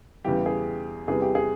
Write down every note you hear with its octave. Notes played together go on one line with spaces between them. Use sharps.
E2 C#3 E3 G3 G4
G#4
E2 C3 E3 G3 G#4
G4
G#4